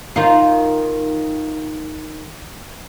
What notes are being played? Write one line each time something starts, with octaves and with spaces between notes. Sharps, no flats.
D#3 D#4 F4